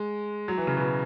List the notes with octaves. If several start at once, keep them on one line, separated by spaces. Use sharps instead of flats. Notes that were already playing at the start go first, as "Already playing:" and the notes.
Already playing: G#3
F#3
E3
C#3
B2